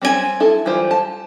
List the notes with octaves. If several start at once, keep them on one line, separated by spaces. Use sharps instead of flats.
G3 C4 C#4 F4 G#5
E4 A4
E3 G3 F4 C5
A5